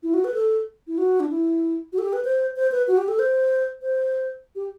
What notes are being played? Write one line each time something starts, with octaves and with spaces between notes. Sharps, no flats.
E4
F#4
B4
A4
E4
F#4
D4
E4
F#4
A4
G4
B4
C5
C5
B4
F#4
G4
A4
C5
C5
G4